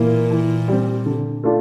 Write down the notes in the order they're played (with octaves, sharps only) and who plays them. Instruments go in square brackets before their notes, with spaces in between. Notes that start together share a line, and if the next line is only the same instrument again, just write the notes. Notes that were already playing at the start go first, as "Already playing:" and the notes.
Already playing: [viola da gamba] A#2 [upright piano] E3 A#3
[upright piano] E3
G3 C4
D3
A3 D4 F4